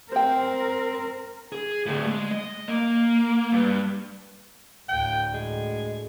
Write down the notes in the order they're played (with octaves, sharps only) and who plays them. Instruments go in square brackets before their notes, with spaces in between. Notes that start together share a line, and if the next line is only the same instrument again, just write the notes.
[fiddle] C4 [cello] A#4 [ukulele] C5 G5
[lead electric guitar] G#4
A2 D3
G#3
D#5
A#3
G2
[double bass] D2 A2 [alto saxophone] G5
[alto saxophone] G#3